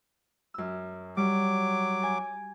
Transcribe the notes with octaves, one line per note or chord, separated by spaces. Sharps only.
F#2 E6
F#3 G3 D6
G#5